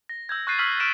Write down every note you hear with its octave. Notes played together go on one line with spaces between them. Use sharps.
A#6
E6 G6 G#6
C#6 F#6 G6 A6 C7 D#7
C#6 E6 F6 B6 F#7
C#6 F6 D7 E7